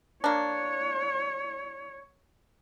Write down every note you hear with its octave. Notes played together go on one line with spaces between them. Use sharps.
A#3 D4 C#5